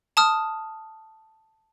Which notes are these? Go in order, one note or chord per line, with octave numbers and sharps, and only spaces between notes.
A5 D#6 F6